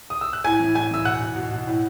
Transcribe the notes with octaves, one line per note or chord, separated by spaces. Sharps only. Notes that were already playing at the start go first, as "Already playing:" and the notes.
D#6
E6
F#6
A2 G#5 G#6
E3
A2 G#5 G#6
E3 E6
B2 F#5 F#6
B2
B2
B2
A2